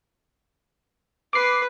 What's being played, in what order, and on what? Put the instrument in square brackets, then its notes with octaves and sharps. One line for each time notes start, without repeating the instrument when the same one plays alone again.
[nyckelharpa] B4 [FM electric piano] D6 C7